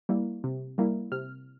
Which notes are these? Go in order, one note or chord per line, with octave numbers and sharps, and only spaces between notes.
G3 A#3 E4
C3
G3 A#3 E4
C3 F6